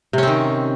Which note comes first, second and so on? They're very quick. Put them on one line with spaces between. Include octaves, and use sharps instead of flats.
C3 C#4 C4 D#3